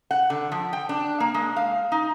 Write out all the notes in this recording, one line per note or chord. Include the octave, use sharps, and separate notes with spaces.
F#5
D3
F3
G5
D4
A#3
G#3
F5
D#4